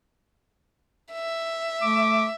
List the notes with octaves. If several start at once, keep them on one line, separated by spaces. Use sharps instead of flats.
E5
A3 D6